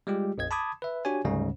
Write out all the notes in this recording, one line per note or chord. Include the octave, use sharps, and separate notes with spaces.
G3 G#3 F4 G4
A#1 F2 D#5 G#6
A5 B5 D6 D#6 G#6
B4 E5
D4 F#4 G4 C#5 G#5
D2 G#2 C#3 G3 G#3 C#4